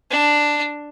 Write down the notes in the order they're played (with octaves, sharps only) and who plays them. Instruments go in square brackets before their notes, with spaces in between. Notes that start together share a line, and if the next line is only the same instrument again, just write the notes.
[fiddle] D4